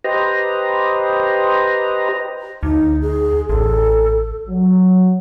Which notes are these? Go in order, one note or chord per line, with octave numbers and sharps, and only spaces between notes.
G4 B4 C5 D#5 A#5
D2 D#4
G#4
A1 A4
F#3